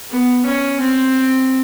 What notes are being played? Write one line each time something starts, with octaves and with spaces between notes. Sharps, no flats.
B3
C#4
C4